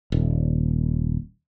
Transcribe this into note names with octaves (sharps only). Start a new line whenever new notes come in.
D#1